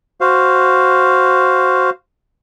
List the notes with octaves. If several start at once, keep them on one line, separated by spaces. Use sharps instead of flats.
F#4 C5 F5